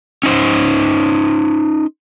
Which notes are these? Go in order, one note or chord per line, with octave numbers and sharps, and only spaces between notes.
C#4 D#4 C5